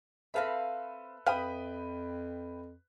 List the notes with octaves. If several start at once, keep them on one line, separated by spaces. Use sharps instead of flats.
C4 A4 B4 E5 F5 B5
F2 B4 E5 F5 G5 B5 D#6